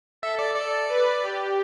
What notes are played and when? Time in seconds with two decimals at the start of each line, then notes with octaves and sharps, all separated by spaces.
0.22 A4 E5
0.39 D5
0.56 A4 D5
0.89 B4
1.23 G4